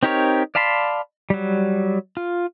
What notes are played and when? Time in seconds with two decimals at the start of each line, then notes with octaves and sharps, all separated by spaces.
0.03 C4 D#4 G4 A#4 C#5
0.55 D5 F5 A5 B5 C6
1.30 F#3 G3
2.17 F4